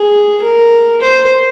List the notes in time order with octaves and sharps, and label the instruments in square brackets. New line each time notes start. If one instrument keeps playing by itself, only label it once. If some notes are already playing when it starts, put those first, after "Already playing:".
Already playing: [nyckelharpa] G#4
A#4
C5